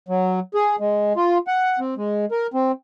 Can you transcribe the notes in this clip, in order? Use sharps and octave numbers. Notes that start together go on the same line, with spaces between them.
F#3
G#4
G#3
F4
F#5
C4
G#3
A#4
C4